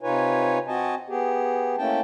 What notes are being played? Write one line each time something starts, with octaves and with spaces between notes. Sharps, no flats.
C3 D#4 F4 B4 C#5 G#5
C4 F#4 D#5 G#5 A5
B3 G4 G#4
A3 A#3 C#4 E4 G5 A5